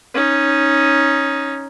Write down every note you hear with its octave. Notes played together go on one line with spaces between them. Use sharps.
C#4 D#4